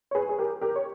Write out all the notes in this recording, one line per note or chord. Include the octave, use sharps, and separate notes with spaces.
C#5
G#4 B4
G#4
G4 A#4
G4 A#4
C#5